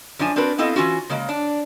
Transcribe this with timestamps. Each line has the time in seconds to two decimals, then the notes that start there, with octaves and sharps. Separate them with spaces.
0.19 F#2 F3 D4 G#5
0.36 C4 D4 F#4 A#4 B4
0.58 B3 C4 E4 A4 D#5 F5
0.76 E3 C#4 F4 F#4
1.09 C#3 G#3 A#3
1.29 D4